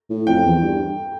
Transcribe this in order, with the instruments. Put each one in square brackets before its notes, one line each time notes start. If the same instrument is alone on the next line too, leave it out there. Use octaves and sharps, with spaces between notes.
[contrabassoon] A2
[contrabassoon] F2 [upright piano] G5
[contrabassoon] E2
G2